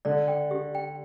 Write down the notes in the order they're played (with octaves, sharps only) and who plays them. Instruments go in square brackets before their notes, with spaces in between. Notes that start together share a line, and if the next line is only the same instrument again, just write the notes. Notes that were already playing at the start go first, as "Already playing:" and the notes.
[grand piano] D3 [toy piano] D5
[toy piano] G5
G4
G5